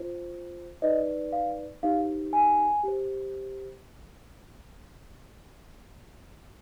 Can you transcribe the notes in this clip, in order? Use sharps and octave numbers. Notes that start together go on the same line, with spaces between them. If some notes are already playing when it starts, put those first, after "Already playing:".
Already playing: F4 C5
D#4 B4 D5 D#5
F5
D#4 G4 C5 F5
G#5
G4 C5